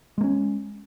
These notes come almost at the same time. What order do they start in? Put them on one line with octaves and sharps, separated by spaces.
G#3 A#3 C#4